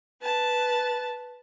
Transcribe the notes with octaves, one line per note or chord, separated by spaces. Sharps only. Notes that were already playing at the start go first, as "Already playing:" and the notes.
B4 A5